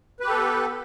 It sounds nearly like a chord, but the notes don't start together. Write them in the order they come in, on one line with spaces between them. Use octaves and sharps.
B4 G4 A4 B3